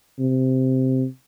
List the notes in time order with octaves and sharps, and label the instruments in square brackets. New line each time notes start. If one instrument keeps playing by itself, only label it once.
[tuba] C3